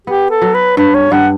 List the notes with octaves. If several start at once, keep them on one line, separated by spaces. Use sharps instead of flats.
B3 G4
A4
F#3
B4
G2 B4
C#5
G2 F#5